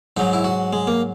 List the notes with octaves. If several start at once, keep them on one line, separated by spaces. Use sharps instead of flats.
G#2 F#3 D#4
E4
F#4
G#3
A#3